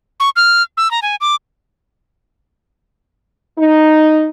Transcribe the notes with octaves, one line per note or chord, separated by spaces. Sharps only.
C#6
F6
E6
A#5
G#5
D6
D#4